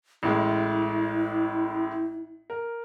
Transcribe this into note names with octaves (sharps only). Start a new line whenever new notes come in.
A1 A2 G#3 E4
A#4